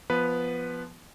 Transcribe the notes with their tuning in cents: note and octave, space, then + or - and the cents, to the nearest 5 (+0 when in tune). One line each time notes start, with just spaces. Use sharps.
F3 -10 B3 +0 B4 +0